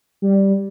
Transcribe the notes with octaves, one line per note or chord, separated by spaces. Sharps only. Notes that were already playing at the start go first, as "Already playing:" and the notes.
G3